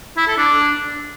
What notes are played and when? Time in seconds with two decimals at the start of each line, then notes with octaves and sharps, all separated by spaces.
0.17 E4
0.27 A4
0.38 D4